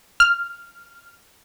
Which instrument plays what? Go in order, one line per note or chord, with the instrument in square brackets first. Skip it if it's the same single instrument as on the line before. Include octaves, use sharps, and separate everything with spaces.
[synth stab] F6